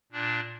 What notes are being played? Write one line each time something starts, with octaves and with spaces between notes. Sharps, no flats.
A#2 D4